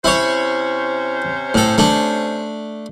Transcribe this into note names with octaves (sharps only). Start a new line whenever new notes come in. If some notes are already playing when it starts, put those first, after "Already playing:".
C3 C#4 E4 C5 C#5
A2 A4
A3 D4